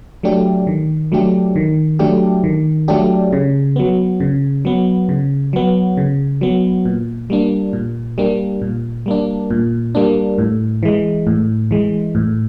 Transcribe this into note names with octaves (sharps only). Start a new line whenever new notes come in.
F#3 A3 D4 G4
D#3
F#3 A3 D4 G4
D#3
F#3 A3 D4 G4
D#3
F#3 A3 D4 G4
C#3
F#3 B3
C#3
F#3 B3
C#3
F#3 B3
C#3
F#3 B3
A#2
G3 A#3 D4
A#2
G3 A#3 D4
A#2
G3 A#3 D4
A#2
G3 A#3 D4
A2
E3 G#3
A2
E3 G#3
A2